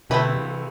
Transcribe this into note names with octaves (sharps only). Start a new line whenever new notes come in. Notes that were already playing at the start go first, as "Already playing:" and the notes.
B2 D3 A3 C4 E4 B4
C3 E3